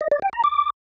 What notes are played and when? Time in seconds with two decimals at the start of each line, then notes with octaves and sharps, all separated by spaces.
0.01 D#5
0.11 D5
0.22 G5
0.33 A#5
0.44 D6